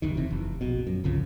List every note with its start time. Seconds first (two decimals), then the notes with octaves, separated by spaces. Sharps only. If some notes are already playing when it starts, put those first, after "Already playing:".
0.02 F#1 D#2 D#3
0.16 F#1 C3 E3
0.31 F1
0.61 A#1 B2
0.87 F#2
1.04 G1 C2 C#3 F3